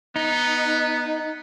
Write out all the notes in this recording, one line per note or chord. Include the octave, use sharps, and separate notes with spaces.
B3 D#4